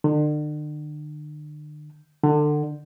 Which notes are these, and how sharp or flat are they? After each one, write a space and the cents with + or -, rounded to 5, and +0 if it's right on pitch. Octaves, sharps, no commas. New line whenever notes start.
D3 +40
D3 +25